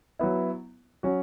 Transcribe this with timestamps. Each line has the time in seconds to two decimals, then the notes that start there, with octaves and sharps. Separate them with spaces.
0.19 F#3 B3 E4
1.03 F#3 C#4 F#4